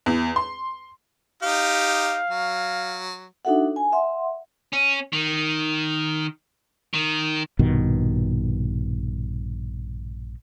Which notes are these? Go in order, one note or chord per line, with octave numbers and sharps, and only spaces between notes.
E2
C6
D#4 G4 F5
F#3
D4 D#4 F#4 A4 E5 F#5
G#5
E5 F#5 C6
C#4
D#3
D#3
A#1 G2 B2 D#3